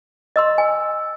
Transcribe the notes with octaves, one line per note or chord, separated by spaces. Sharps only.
D#5 C6 E6 A6
G#5